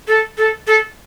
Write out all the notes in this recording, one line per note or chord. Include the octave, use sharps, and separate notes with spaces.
A4
A4
A4